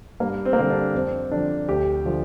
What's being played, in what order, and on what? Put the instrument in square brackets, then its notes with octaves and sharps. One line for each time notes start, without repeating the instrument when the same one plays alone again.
[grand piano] G2 A#3
C4
A#3
D3 G3 C4
D4
F2 C4
D3 F3 D4
D2 G4
D3 F3